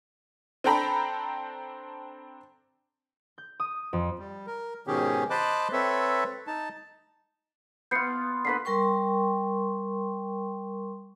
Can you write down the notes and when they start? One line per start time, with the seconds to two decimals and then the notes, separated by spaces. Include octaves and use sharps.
0.64 C4 D4 A4 G5 A#5 B5
3.38 G6
3.60 D#6
3.93 F2
4.19 G3
4.47 A#4
4.87 G#2 B2 D#3 C#4 G4 G#4
5.30 C5 D#5 A5 B5 D6 F#6
5.73 C4 A4 B4 C#5 E5
6.47 D#4 A5
7.91 B3 F4 G6 C7 C#7
8.45 D3 A#3 B4 B6 C7
8.65 G3 A#4 G5 C6 C#6